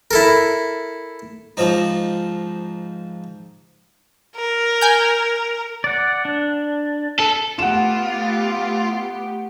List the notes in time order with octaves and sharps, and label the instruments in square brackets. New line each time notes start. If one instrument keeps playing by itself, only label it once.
[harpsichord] E4 A4 A#4
G#2 F3 C4 D#4
[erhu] A#4
[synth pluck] G#5 G6
[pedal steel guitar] D5 F#5
D4
[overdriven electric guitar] A4
[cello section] A3 B3 G4 [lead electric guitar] F4 [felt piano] F#5 E7